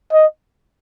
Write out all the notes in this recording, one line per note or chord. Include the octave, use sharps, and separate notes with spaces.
D#5